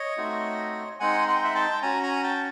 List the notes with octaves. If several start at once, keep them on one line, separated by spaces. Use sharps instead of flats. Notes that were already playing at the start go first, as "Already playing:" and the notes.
Already playing: C#5 D#5
A3 C4 D#4 F#4
G#3 C4 D#4 F#5 G#5
F#5
G5
E5 F#5
G5 A5
C#4 F#4 G#5 A#5
G#5 A#5
G5 A5